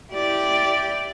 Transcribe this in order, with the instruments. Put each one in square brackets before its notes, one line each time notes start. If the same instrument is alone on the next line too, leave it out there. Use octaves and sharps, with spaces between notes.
[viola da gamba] E4 G4 D5